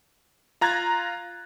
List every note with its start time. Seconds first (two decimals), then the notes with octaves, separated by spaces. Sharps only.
0.61 F4 A#5 F#6 G#6 A6